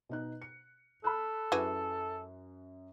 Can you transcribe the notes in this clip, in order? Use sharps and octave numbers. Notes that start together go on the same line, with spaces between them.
B2 D#4 F#6
C#7
A4 B5 F6 F#6
F#2 E3 F#4 G#4